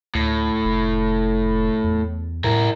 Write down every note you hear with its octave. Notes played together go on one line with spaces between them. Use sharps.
D2 A2
F1
E2
A2 E4 A#4